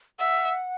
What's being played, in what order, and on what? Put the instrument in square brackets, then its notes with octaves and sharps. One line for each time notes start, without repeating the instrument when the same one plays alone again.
[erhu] E5 [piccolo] F#5